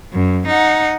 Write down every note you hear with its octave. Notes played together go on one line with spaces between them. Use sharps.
F#2
D#4 F#5